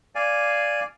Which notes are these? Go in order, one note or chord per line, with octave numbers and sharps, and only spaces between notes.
D5 F5 G#5